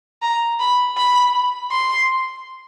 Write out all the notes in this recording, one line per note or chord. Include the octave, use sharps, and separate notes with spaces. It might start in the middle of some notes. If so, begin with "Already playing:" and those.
A#5
B5
B5
C6